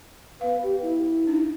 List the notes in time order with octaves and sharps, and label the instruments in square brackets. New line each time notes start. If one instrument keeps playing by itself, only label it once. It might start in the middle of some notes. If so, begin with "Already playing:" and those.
[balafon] B3 F5 [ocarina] B4
[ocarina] G4
E4
[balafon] D4 D#4